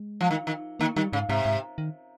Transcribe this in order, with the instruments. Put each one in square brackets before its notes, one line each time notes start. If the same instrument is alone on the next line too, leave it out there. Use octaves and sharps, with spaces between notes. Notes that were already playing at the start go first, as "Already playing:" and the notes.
Already playing: [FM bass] G#3
[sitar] F3
D#3
D#3
[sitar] D#3 [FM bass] A#3
[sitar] D#3 [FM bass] G3
[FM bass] G#2 [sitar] C#3
[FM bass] G#2 [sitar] C3
[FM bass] G#2
D#3